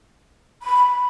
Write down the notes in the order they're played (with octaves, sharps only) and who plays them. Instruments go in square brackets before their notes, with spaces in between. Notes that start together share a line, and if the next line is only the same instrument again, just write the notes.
[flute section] B5